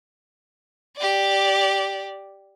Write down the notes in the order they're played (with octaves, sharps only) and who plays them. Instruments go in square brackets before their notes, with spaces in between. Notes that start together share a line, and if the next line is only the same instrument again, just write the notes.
[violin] G4 D5